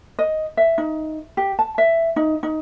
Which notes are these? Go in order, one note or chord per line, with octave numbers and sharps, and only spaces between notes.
D#5
E5
D#4
G4
A5
E5
D#4
D#4